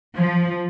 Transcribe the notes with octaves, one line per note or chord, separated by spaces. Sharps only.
F3